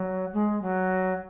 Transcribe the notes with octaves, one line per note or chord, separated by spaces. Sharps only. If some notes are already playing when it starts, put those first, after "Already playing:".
Already playing: F#3
G#3
F#3